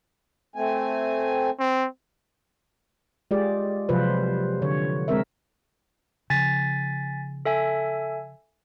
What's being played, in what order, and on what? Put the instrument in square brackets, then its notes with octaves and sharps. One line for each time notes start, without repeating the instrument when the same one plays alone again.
[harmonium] A3 C4 G#5
[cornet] C4
[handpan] G#3 F4 G4 G#4 D5
C3 F3 F#3 F4 B4 C5
D3 C#5
G#3 C4 A#4 E5
[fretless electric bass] C#3 F3 [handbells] G#5 A6 B6
[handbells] A4 E5 G#5